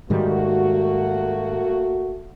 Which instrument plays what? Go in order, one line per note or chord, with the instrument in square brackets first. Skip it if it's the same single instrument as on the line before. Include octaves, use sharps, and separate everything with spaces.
[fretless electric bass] G#2 D#3 G3 [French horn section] A3 A#3 F#4